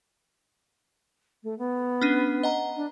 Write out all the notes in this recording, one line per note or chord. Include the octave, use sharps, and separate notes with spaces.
A3
B3
C#4 D4 D#7
D#5 F#5 A#5
D4